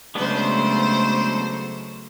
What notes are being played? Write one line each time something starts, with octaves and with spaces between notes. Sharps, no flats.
C#3 F#3 G#3 A3 B3 D4 C5